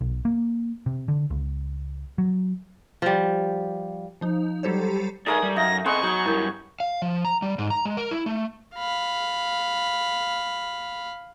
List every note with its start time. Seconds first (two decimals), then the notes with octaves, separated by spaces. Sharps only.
0.01 B1
0.25 A#3
0.86 C3
1.08 D3
1.30 C#2
2.18 F#3
3.02 F3 G3
4.21 F3 D#4
4.63 F#3 G3 G4 A4 C5 C#5
5.26 A3 D4 D#4 G#4 A#4 G#5 D#6
5.43 G3
5.56 F#2 D#4 E5 F5 A#6
5.86 B3 C4 G#4 D#5 F#5 C6 C#6
6.03 F#3 D#4 C#5 G6 F#7
6.26 G2 F#3 E4 A#4 G6
6.80 F5
7.02 F3
7.25 A#5
7.42 G3
7.58 G#2
7.70 A#5
7.85 G#3
7.97 A#4
8.11 E4
8.26 A3
8.76 F5 B5